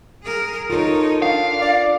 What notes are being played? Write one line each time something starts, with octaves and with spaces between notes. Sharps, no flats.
G#4 A#4
D#4 F4 A4 A#4 C#5
D4 F5
D5